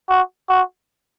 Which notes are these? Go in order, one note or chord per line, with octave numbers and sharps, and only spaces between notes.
F#4
F#4